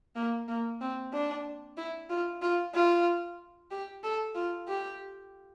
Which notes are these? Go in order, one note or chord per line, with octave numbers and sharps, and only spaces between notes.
A#3
A#3
C4
D4
E4
F4
F4
F4
G4
A4
F4
G4